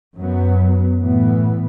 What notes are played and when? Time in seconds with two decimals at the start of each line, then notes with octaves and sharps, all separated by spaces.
0.17 F#2 F#3 B3
0.98 A2 E3 B3